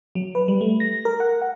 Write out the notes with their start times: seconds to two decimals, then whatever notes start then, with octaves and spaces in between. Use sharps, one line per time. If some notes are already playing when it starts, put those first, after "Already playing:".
0.15 F#3
0.35 B4
0.48 G3
0.61 A3
0.80 A#6
1.05 A#4
1.20 F#5
1.41 F#5